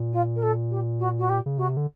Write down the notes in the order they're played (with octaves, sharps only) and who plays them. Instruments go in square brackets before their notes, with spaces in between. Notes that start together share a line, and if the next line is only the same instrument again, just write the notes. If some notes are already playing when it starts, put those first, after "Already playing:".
Already playing: [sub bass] A#2
[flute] F4
A#4
A4
G4
F#4
F#4
G4
[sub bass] C#3
[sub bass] C3 [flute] F#4
[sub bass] D3